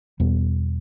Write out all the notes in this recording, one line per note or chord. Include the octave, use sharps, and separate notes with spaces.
E2 B2 G3 B3